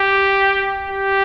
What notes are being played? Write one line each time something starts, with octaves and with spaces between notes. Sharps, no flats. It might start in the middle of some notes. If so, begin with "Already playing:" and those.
Already playing: G4
G4